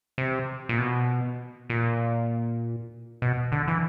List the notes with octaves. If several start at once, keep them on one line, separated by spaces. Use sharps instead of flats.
C3
A#2
B2
A#2
B2
D3
E3